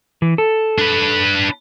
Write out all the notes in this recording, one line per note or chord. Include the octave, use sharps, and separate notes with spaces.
E3
A4
D4 B4